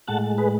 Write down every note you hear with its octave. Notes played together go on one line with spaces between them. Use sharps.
A2 G#3 F#5 A5
G#4 B4